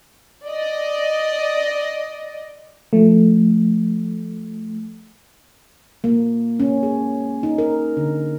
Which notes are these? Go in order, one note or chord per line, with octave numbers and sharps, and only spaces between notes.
D5 D#5
F3 A3
A#3
C#4
G#4
D#4
A#4
D3